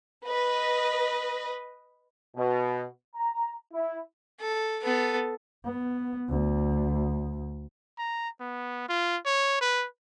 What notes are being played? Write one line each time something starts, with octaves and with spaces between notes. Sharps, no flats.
B4 D#5
B2
A#5
E4
A4
B3 A4
B3
D2
A#5
B3
F4
C#5
B4